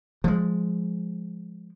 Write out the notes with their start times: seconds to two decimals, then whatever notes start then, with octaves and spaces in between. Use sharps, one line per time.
0.24 F3 G#3